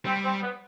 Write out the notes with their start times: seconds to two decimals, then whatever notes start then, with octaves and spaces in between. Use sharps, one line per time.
0.05 G3 C4
0.23 C4
0.42 B3